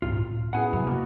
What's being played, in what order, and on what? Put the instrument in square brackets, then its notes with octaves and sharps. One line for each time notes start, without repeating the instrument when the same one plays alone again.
[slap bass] C#2 G#2 C4 [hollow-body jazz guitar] F4
[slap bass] A2
[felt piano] B3 E4 G#4 [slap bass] C#4 [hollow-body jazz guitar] F#5 G#5
[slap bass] F#2 C3 [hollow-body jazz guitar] F#3
[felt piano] B2 F#4 [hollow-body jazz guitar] A#3